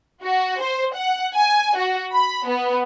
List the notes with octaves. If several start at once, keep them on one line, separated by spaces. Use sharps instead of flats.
F#4
C5
F#5
G#5
F#4
B5
B3